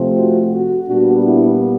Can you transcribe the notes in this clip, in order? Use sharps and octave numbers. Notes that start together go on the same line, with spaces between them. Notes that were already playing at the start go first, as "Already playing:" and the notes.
Already playing: C3 F3 A3 C4
F#4
F#4
A#2 G3 B3 D4 F#4
E4